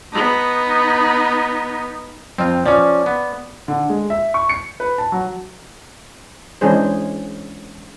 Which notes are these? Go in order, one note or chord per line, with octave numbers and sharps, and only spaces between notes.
B3 D#4
F2 C4 F4
F3 C#4 D5
B3
D3
G#3
E5
C#6
C#7
B4
A5
F#3
E3 G#3 C#4 D4 G#4 C5